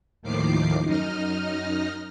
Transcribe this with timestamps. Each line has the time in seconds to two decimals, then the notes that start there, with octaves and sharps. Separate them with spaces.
0.22 D#2 A2 D#3 F3 D6 C7
0.83 F#2 D#4 D#5 F6